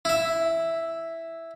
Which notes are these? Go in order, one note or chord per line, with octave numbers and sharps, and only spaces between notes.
E4 E5